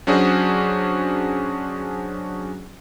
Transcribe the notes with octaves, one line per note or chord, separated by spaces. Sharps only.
F#3 C#4 D4 F#4 G#4 C5